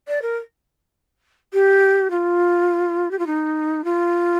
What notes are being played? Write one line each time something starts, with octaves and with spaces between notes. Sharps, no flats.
D5
A#4
G4
F4
G4
F4
D#4
F4